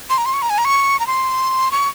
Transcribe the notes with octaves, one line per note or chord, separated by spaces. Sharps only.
C6
A#5
C6
C#6
A#5
G#5
A#5
C#6
A#5
C6
C#6